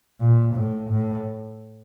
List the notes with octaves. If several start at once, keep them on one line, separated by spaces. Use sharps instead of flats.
A#2
A2
A2